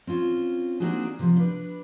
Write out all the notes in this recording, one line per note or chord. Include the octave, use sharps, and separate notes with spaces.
C4 C#4 F4
A#3 C4 D4 D#4 F#4 G#4
C3 F3
D4 B4